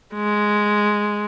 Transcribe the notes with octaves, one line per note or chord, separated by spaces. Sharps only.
G#3